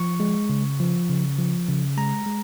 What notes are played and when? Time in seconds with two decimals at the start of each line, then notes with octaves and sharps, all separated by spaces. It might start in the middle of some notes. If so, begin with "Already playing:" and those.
Already playing: F3 C#6
0.20 G#3
0.50 C#3
0.80 F3
1.09 C#3
1.38 F3
1.68 C#3
1.97 G#3 A#5
2.26 G#3